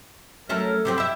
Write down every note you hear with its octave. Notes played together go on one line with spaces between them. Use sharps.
F#3 A3 C#4 A#4 E5
C3 F#3 C4 G4
E4 E5